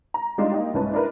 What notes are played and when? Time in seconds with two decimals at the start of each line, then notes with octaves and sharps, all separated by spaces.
0.14 A#5
0.38 G3 G#3 D4 D#4 F4
0.52 A#3 D#4 G4
0.74 C2 G#2 C#4 B4 A5
0.93 D4 E4 A#4 B4